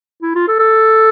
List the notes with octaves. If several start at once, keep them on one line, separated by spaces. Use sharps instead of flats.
E4
F4
A4
A4